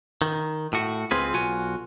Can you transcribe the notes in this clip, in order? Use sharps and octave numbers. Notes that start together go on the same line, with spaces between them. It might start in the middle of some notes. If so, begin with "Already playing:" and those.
D#3
A2 F#4
C#2 C4 F4 G#4 B4
B1 F4 F#4 G#5